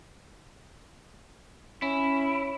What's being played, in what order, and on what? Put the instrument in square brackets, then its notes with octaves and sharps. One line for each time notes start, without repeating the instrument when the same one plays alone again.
[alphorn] C#4 [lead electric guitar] E4